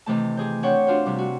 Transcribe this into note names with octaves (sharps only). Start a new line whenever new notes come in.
C3 D#3 E3 A3 A5
G4 G#4 C5
C4 D4 C#5 F#5 G5
D4 F4 F#4 C5
C3 G3
F#4